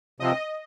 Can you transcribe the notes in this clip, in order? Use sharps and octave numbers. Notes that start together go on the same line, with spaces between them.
C3 F3 C4 D#5